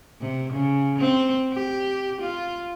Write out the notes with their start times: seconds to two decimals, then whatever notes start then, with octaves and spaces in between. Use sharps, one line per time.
0.20 C3
0.52 C#3
0.99 C4
1.53 G4
2.21 F4